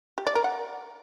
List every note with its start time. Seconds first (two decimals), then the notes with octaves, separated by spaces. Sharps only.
0.18 G4
0.27 D5
0.35 A#4
0.44 F#5